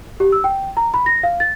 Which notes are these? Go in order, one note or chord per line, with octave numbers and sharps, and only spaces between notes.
G4
E6
G5
A#5
B5
A#6
F5
A6